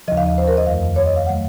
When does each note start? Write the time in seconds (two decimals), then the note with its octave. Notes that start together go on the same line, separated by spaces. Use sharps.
0.08 D#2 C#3 F3 D#5
0.17 F5
0.26 D#5
0.38 C5
0.48 A#4
0.57 D#5
0.67 F2 D#3 A3 F5
0.96 C#5
1.06 D#5
1.16 F5
1.26 D#3 F#3 A3 F#5